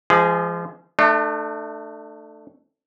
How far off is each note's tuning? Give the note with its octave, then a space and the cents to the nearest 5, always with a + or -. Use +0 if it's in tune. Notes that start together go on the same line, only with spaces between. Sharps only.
F3 -30 G#3 +0 G#4 +0
A3 +10 D4 +40